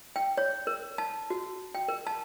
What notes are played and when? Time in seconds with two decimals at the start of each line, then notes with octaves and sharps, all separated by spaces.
0.16 G5
0.37 C#5
0.67 A#4
0.98 A5
1.30 F#4
1.75 G5
1.88 A#4
2.07 A5